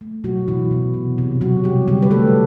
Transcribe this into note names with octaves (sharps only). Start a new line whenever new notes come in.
A3
B2 F#3 F#4
B2 E3 E4
B2
C3
C3
C3 F#3 F#4
C3 G3 G4
D3 G3 G4
B4
A3 A4